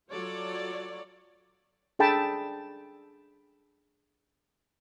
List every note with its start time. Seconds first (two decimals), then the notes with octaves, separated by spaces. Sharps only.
0.11 F#3 F4 A4 C#5 D5
1.99 D4 G#4 A4 G5 A5 B5